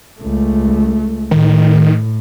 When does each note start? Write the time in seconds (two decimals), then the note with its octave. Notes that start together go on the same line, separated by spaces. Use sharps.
0.19 C#2 A3
1.31 A2 D#3